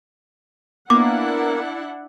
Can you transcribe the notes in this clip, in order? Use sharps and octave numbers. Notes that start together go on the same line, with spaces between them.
A#3 B3 D4 E4 F#5 D6